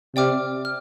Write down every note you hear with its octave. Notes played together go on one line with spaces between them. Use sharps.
C3 D5 G5 D6 F6
F6